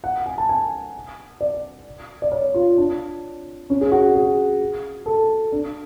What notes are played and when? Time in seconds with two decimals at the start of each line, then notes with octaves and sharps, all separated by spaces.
0.04 F#5
0.26 G#5
0.38 A5
0.49 G#5
1.41 D5
2.22 D5
2.32 C#5
2.54 F4
2.78 D4
3.70 C#4
3.81 G#4
3.92 F#4
4.15 G#4
5.06 A4
5.52 D4